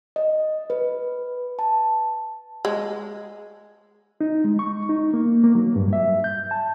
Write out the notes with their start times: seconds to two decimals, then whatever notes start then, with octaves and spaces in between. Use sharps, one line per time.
0.16 D#5
0.70 B4
1.59 A5
2.65 G#3
4.21 D#4
4.44 G#3
4.59 C#6
4.89 D#4
5.14 A#3
5.44 A#3
5.55 F#3
5.76 G2
5.93 E5
6.24 G6
6.51 A5